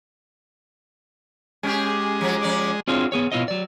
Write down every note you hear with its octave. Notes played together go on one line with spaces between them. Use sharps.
G#3 C#4 G4 G#4
F3 F#3
F3 C#4 D5
C4 D4 F4 F#4 G#4 C#5
B3 G#4 C#5
B2 B3 E4 F4 C#5 D#5
F#3 D5